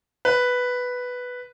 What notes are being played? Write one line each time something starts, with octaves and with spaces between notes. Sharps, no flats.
B4